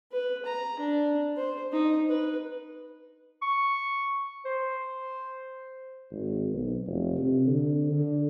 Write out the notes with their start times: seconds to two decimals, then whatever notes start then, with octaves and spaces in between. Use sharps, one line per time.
0.12 B4
0.46 A#5
0.79 D4
1.37 C5
1.72 D#4
2.09 B4
3.42 C#6
4.46 C5
6.11 G#1
6.51 B1
6.86 F1
7.17 C3
7.47 D3
7.91 D3